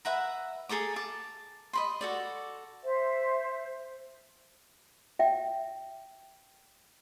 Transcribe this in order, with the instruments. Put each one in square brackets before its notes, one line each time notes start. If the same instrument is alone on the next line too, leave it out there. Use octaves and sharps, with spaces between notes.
[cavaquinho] B4 E5 F#5 A#5
G#4 A4 A#5 D6
A5 D6
D#5 B5 C6
F#4 A4 D5
[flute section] C5 E5
[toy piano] E5 G5